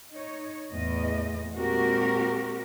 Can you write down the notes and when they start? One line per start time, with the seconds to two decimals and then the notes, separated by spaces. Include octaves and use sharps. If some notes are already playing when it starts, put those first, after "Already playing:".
0.12 D#4 C#5
0.72 E2 A2 D#5
1.54 A#2 G#3 C4 F#4 G4 A#4